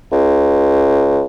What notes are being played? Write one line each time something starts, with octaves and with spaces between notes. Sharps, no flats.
C#2